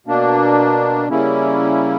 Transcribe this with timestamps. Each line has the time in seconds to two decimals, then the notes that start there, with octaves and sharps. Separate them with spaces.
0.07 B2 A#3 D4
1.08 C#3 G3 A#3 C#4 E4